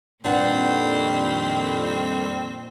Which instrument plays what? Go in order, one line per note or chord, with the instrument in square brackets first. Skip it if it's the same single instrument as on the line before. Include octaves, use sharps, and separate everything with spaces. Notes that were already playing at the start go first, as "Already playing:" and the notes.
[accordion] F2 D#3 G3 [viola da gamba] A#2 [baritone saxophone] C4 [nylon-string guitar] D4 B4 F#5